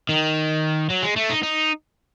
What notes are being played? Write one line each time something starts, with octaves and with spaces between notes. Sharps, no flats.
D#3
F#3
G#3
A3
D#4
D#4